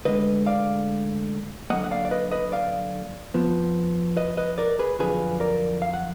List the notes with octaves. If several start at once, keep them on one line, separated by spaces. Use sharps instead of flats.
D2 D3 G#3 B4 D#5
D5 F5
D3 F#3 A#3 D#5 F#5
F#5
D5 F5
D5
B4 D#5
B4 D#5
D5 F5
F2 F3 B3
B4 D#5
B4 D#5
A#4 D5
G#4 B4
F2 D3 F#3 D4 F4 G#4 B4
A#4 D5
F5
F#5